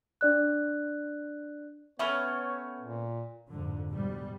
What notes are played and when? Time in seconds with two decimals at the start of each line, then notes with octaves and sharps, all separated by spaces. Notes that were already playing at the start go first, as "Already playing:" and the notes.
0.21 D4 D5 F#6
1.99 A3 B3 C#4 C#5 E5 B5 D6
2.81 A#2
3.50 F2 G#2 D3
3.88 G#2 B2 G3